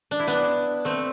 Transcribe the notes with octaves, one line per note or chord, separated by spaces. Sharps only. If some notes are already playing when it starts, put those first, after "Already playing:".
D4
E4
B3 D4
A3 C4